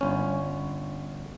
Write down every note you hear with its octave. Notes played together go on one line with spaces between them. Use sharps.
G1 C#4